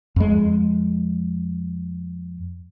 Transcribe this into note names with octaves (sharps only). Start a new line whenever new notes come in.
F2 G#3